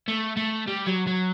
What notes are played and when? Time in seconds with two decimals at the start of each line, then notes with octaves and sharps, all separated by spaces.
0.08 A3
0.37 A3
0.67 G3
0.86 F#3
1.07 F#3